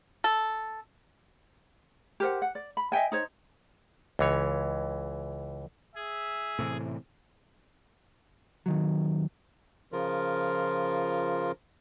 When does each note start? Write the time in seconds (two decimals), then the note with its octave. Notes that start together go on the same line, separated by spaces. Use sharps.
0.24 A4
2.20 G4 A#4 C5 F#5
2.42 F#5
2.55 D5
2.77 B5
2.92 D#5 E5 G5 G#5
3.12 D#4 C5 C#5
4.19 C#2 E3 C#5
5.95 G#4 E5
6.59 A2 C3 E3
8.66 D#2 D#3 F#3
9.92 C#3 F3 F4 A#4